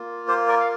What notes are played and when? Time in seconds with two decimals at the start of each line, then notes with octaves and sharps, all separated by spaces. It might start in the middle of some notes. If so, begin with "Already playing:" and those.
Already playing: A#3 F4
0.28 G4 C5
0.48 A#4 D5
0.60 F5